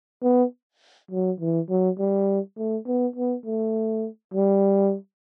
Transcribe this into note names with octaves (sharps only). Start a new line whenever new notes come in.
B3
F#3
E3
F#3
G3
A3
B3
B3
A3
G3